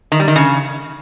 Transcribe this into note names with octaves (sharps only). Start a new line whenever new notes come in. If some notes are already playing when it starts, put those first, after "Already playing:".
D#3
G3
D#3
C#3